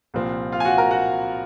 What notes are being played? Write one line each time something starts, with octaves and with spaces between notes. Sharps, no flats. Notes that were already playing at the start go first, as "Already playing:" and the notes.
C2 A#2 F3 C4
F4 F5
G#5
F#4 F#5
A#4 A#5
F#4 F#5